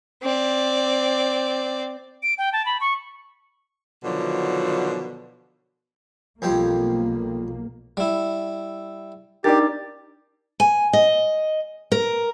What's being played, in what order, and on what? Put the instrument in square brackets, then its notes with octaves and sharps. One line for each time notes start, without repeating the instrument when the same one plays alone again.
[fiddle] C4 D5
[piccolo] D7
G5
A5
B5
C#6
[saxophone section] B2 D3 D#3 F3 F#3
[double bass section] B1 A#3 [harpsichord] F2 F3 G3
[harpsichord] G3 E4
[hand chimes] D4 D#4 A6 [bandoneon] G4 [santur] A#4 D5
[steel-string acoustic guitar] G#5
D#5
A#4